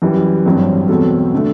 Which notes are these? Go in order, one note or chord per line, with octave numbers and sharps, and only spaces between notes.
F#2 E3 G3
A1 G2 F#3 C4
E2 B2 F#3 C4 F#4 A4
D3 A3